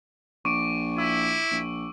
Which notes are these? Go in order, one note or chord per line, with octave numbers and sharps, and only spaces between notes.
A#1 C#6 D6 D7
E4 E6
A#1